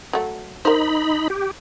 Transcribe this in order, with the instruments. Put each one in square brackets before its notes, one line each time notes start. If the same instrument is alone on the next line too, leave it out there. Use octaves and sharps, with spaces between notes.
[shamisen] F#3 A3
[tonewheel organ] D#4 B5 [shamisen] A#4 C5
[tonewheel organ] G4